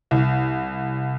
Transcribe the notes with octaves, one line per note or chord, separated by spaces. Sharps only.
C2